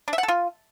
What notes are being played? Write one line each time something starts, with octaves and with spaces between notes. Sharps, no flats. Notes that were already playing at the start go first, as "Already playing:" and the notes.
D4
E5
F#5
A4
F4